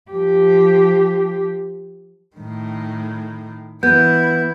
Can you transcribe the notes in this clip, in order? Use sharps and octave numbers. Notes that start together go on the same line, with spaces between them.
F3 G4
A2 D#3
E3 B3 E4 G6